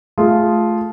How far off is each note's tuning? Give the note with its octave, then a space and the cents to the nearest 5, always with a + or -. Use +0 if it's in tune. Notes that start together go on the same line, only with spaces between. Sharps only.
A3 -15 F4 -5 G#4 +0